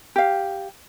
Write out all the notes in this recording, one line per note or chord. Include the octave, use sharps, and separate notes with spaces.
G4 F5